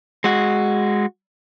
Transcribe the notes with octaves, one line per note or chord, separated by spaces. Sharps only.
G#3 F#4